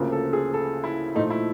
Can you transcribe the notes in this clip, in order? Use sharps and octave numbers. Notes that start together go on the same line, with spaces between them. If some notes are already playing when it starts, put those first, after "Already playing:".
Already playing: D2 C#3 F3 A#3
A4
G#4
A4
E4
A#2 F3 A3 D#4
E4